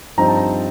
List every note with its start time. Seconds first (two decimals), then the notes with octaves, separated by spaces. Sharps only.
0.18 G2 F3 C4 D#4 A#5
0.28 A5
0.37 A#5